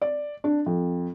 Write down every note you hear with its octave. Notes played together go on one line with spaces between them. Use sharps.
D5
D4
F2